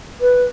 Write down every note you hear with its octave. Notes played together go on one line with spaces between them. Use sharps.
B4